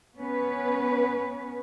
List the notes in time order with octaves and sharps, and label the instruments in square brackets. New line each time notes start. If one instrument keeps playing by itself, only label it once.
[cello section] B3 C#4 B4